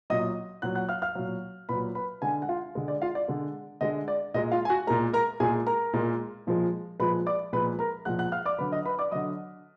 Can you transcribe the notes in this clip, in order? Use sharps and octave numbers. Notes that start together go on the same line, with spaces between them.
A#2 F#3 D#5 D#6
A#2 F#3 F#5 F#6
F#5 F#6
F5 F6
F5 F6
A#2 F#3
A#2 F#3 B4 B5
B4 B5
D3 G#3 G#4 G#5
F#5
F4 F5
D3 G#3
D5
F4 F5
D5
D3 G#3
D3 G#3 D#5
D5
A#2 G#3 D#5
F4 F5
G#5
F#4 F#5
A#2 G#3 A#4 A#5
A#4 A#5
A#2 G#3 G#4 G#5
A#4 A#5
A#2 G#3
A#2 F3 G#3
A#2 F3 G#3 B4 B5
D5 D6
A#2 F3 G#3 B4 B5
A#4 A#5
A#2 F3 G#3 F#5 F#6
F#5 F#6
F5 F6
D5 D6
D3 F#3 B4 B5
D#5 D#6
B4 B5
D5 D6
D3 F#3 D#5 D#6